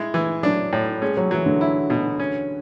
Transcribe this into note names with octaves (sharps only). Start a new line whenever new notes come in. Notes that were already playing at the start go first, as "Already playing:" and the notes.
Already playing: G#3 E4
E3
F#3 D4
A2
G#3 C#4
F#3
E3 F#3
D3
E4
B2
C#4